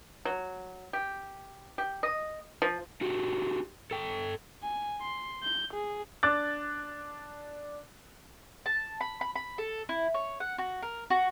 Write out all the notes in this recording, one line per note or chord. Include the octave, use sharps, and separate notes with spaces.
F#3
G4
G4
D#5
F3
D4 F#4 G4
A4 G5
G#5
C6
G6
G#4
D4 D6 F#6 A6
A5
B5
B5
B5
A4
E4
C#5
F#5
F#4
A#4
F#4